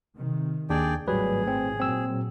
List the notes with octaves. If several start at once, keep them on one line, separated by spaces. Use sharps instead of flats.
C3 D#3
D#2 D4 G#4 D5 G5
G#1 A2 F#3 G3 G#4 B4
A3 C4
A#2 F#3 C4 E6